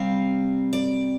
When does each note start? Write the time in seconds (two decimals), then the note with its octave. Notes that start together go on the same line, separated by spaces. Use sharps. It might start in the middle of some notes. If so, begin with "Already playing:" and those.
Already playing: C3 G3 C4 F5
0.73 D5